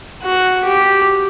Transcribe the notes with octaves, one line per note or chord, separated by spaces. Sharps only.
F#4
G4